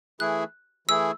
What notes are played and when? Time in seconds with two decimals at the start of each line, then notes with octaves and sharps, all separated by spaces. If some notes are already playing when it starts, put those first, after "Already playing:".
0.20 E3 A3 E4 G#4 F#6
0.88 E3 A3 E4 G#4 E6